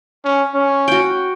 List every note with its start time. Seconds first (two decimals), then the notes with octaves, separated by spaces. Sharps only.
0.24 C#4
0.54 C#4
0.88 F#4 G5